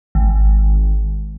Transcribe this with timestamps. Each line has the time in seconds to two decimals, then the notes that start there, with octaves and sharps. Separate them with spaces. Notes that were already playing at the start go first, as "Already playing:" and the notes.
0.15 G#1